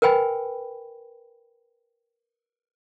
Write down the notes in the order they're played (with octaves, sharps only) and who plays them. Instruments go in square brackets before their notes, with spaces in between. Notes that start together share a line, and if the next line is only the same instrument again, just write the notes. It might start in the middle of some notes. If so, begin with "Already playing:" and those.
[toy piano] A#4 B4 G5 G#5 B5